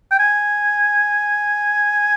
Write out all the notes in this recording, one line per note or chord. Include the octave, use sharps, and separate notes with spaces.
G5
G#5